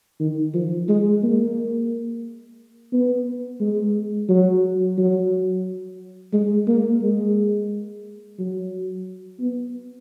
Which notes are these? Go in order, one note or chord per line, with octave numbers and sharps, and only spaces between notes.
D#3
F3
G#3
A#3
B3
G#3
F#3
F#3
G#3
A#3
G#3
F#3
B3